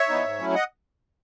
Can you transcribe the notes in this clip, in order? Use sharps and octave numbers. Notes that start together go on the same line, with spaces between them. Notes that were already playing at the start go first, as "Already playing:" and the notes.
Already playing: C#5 E5
E3 B3 D#4
G#2
F#3 A3 C#4 E4
D#5 F#5